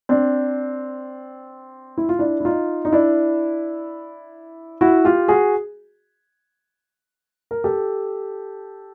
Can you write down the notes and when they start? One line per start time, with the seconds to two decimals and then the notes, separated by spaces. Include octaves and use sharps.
0.09 C4 D4
1.98 E4
2.09 F4
2.19 D4 E4
2.40 E4
2.45 D#4 F4
2.85 D#4
2.92 D4 E4
4.81 E4 F#4
5.05 F4 G4
5.28 F#4 G#4
7.51 A#4
7.64 G4 A4